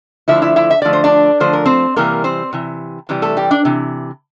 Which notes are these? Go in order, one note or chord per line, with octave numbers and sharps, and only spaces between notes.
D3 F3 A3 E4 E5
E4 E5
E4 E5
E5
D3 F3 A3 D5
C5
D4 D5
D3 F3 A3 C5
A#4
C4 C5
C3 E3 G3 A#3 A#4
C4 C5
C3 E3
C3 E3 G3
A3 A4
G3 G4
D4 D5
C3 E3